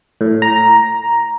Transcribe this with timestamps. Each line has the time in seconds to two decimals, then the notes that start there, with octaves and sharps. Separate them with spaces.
0.21 A2
0.42 A#5